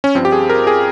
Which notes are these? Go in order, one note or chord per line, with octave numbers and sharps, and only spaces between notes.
C#4
G2 F3 C4
G4
G#4
A#4
G#4